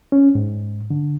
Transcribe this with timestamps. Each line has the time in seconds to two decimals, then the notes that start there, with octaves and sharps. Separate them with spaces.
0.12 C#4
0.35 G#2
0.90 D3